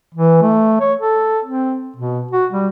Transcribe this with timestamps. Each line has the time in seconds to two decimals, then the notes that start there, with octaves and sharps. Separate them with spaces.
0.15 E3
0.42 A3
0.81 C#5
0.98 A4
1.45 C4
1.96 B2
2.31 F#4
2.52 G3